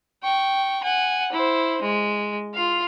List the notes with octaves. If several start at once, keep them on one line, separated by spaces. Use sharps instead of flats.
G5 C#6
F#5 G#5
E4 C5
G#3
F4 F5